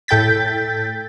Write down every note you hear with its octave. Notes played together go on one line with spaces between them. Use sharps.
A2 A4 G5 G6 A6 B6